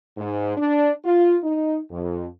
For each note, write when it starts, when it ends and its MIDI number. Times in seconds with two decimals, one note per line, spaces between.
0.17 0.56 44
0.57 0.90 62
1.04 1.36 65
1.44 1.79 63
1.91 2.26 41